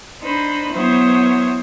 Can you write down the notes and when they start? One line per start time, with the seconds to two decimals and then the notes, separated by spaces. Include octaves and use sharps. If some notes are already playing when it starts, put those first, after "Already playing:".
0.20 D4 D#4 C5 B5
0.71 E3 F#3 B3 C5 C#5 D#6